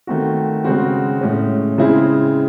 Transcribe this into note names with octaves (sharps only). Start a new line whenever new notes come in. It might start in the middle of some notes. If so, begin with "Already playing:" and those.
D#3 A3 C4 F#4
C#3 G#3 C4 F#4
A2 G#3 C#4
C#3 G#3 C4 E4 G#4